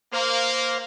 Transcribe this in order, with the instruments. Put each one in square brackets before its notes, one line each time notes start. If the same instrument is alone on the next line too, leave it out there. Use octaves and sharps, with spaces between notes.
[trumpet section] A#3 [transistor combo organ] C5 F5